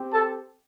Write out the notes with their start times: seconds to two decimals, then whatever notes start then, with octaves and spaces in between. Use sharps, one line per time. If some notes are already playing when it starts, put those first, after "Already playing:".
Already playing: C4 G4
0.13 A4 A5